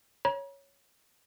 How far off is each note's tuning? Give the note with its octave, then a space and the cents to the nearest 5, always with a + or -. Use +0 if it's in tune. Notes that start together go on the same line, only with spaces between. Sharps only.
C#5 +0 A#5 +45